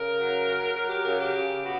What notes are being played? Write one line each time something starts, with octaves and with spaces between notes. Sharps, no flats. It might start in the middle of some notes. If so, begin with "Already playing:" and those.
Already playing: C#3 A#4
F#3
F#3
F#3 A#4
G4
C#3 A#4
G4
C#3
B3 F#4